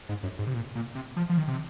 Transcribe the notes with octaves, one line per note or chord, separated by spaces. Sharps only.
G#2
F#2
G#2
C3
A#2
A#2
C3
F3
F3
D#3
C3